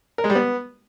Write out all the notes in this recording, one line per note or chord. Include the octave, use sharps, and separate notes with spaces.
A#4
G#3
G3
B3